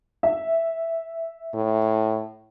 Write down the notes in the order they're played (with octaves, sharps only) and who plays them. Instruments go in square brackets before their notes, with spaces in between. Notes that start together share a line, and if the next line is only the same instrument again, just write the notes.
[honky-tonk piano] E5
[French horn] A2